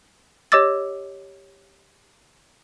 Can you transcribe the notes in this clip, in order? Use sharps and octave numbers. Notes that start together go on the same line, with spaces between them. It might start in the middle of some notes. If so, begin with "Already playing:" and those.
G4 C#5 D#5 D6 E6 A6